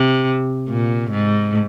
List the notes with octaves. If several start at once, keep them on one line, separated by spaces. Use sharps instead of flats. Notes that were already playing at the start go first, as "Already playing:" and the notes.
Already playing: C3
A#2
G#2